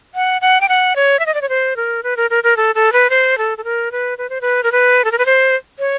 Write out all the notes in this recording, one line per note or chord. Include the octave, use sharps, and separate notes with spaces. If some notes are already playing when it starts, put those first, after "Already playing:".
F#5
F#5
G5
F#5
C#5
E5
D#5
D5
C#5
C5
A#4
B4
A#4
A#4
A#4
A4
A4
B4
C5
A4
A4
A#4
B4
B4
C5
B4
A#4
B4
A4
A#4
B4
C5
C#5